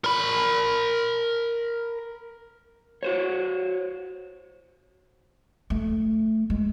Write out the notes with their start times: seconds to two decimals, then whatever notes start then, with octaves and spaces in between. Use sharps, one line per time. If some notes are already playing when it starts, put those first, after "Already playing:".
0.04 A#4 B5
3.03 F#4 C5 C#5
5.70 A3
6.50 G#3